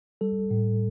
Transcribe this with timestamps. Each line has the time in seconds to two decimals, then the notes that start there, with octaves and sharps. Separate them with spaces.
0.21 G3 A4
0.51 A2